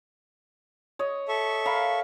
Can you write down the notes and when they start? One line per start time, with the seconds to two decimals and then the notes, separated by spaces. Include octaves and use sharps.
0.99 C#5 D#5
1.28 A4 E5 C#6
1.66 A#4 F5 B5